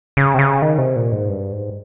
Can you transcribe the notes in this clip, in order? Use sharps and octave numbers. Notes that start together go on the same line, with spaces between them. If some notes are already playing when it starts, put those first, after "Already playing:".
C#3
C3
C#3
D#3
C3
A#2
G#2
G2
G#2